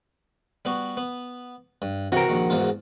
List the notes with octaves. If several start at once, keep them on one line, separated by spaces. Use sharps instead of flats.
G3 B3 F#4
B3
G2
C3 E3 F#4 A#4 G5
A#1 D#3
E2 G#2 F4